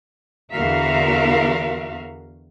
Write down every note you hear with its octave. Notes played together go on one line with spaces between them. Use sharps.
E2 D3 F#4 A#4 E5 F5